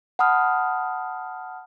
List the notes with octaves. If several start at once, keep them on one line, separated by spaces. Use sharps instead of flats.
F#5 A5 B5 D#6 F6